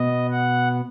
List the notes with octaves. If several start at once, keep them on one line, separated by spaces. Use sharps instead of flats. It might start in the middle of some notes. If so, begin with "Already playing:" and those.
Already playing: B2 B3 D#5
F#5